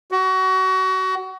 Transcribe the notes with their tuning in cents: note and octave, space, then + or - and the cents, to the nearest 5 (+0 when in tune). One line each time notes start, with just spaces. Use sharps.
F#4 +25